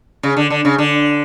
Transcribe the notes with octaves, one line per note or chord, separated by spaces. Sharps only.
C#3
D3
D3
C#3
D3